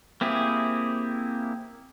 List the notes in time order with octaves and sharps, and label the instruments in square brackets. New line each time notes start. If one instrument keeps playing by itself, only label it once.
[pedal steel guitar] A#3 C4 E4 G4 G#4